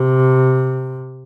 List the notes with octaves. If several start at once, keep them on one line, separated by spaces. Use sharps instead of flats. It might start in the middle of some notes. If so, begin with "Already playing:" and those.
Already playing: C3